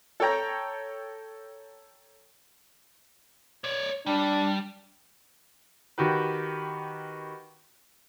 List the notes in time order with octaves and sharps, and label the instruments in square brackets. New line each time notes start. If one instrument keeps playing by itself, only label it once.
[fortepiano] A4 C#5 G5 A#5
[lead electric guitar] C#5 D5
[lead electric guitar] G3 [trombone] D4
[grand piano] D#3 F#4 G4 B4